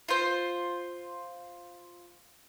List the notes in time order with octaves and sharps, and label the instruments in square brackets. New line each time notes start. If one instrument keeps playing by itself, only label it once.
[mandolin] F4 C5